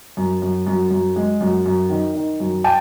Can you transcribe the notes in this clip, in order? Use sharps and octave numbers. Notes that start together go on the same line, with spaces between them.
F#2
F#2
F#2
F#2
G#3
F#2
F#2
D#3
D#3
F#2
G5 A5